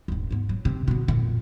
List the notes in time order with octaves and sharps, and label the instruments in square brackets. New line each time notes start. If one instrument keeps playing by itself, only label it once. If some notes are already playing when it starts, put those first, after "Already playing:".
[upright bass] D#1 G#2
G#2 B3
F#3
C3
B2 D3
F2 A#2